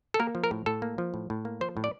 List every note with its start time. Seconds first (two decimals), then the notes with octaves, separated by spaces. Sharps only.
0.14 A4
0.20 A#3 A#4
0.35 F3
0.44 A#4
0.51 A2
0.66 A2 A4
0.82 A#3
0.98 F3
1.14 A2
1.30 A2
1.45 A#3
1.61 F3 C5
1.77 A2
1.84 D5